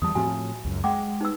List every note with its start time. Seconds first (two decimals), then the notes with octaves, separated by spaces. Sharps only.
0.02 E2 E3 G3 A5 D#6
0.15 A2 F3 C4 F#4 G#5
0.65 C#2 F#2
0.84 G#3 F#5 G5 D6
1.21 D#4 B4 E6